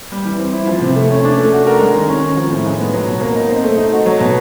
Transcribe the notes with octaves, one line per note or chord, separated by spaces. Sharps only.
G3
E3
C4
E4
F3
C3
A3
C#4
D4
A3
F#4
A#4
G#3
D#3
C#4
D#3
F3
A2
G#3
B3
F#3
B2
A#3
D#4
C4
A3
D#4
F#4
F#3
B2